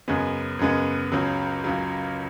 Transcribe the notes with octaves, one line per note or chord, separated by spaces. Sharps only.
F#2 C#3 G#3 B3
F#2 C#3 G#3 B3
C#2 C#3 F#3
C#2 C#3 F#3